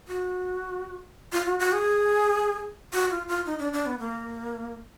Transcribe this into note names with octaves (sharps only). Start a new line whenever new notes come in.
F#4
F4
F#4
F#4
G#4
F#4
F4
F4
D#4
D4
D4
B3
A#3